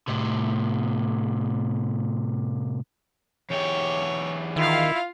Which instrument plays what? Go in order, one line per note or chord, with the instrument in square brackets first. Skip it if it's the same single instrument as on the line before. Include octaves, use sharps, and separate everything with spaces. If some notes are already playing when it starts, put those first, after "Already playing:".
[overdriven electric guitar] A2 C3
[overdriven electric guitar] E2 G4 [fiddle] C#5
[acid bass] D#3 [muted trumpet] E4 [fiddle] F4 F5